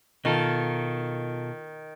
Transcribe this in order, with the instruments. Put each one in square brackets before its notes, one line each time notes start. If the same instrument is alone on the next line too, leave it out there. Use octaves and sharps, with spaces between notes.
[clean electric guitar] B2 F4 A4 [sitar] D#3